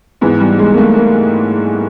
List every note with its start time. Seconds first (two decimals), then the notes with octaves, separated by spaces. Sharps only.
0.21 G#2 E3 B3
0.40 G3
0.59 G#3
0.74 A#3
0.78 A3
0.96 A#3